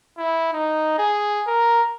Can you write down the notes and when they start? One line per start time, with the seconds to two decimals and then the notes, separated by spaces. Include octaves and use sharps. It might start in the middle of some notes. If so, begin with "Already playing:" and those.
0.18 E4
0.53 D#4
0.98 G#4
1.47 A#4